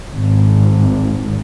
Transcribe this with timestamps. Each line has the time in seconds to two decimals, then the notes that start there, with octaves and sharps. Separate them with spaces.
0.12 G#1